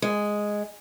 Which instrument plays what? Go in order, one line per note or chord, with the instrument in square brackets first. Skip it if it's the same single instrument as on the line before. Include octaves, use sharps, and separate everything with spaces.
[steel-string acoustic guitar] G#3